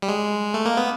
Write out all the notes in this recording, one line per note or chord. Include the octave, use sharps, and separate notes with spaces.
G3
G#3
A3
A#3
B3